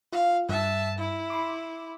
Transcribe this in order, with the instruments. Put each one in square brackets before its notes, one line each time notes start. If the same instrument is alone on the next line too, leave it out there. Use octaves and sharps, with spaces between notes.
[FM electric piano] F4 [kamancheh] F5
[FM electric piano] G2 [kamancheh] E5 A5
[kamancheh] E4
[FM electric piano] B5 C6 D6